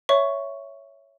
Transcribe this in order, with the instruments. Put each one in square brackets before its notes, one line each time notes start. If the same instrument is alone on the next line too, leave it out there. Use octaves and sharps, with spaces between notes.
[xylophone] C#5 E5 C#6